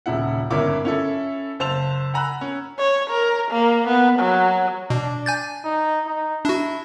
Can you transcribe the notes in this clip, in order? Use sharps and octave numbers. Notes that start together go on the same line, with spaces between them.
D#1 C#3 E4 F#5
G1 G#2 C#4 E4 A#4 D6
C#4 E4 A4
F#1 C5 A5 E6 F7
F#5 G#5 A#5 B5 E6 F#6
C#4
C#5
A#4
A#3
B3
F#3
B2 D4
G#5 G6 A6
D#4
D#4
D4 E4 F#4